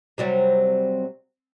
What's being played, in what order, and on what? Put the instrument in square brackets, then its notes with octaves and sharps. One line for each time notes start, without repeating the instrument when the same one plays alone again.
[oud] C3 F#3 G3